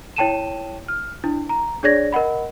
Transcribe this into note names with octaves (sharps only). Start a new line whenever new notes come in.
E4 C#5 G5 A5 D#7 E7
F6
D4 E4
A#5
D4 G#4 C#5 D5 G#6 A#6
A#4 D#5 F#5 B5